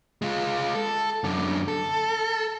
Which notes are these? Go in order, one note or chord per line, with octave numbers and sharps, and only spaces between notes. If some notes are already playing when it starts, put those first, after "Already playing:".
G#3 F4
A4
F#2 D3
A4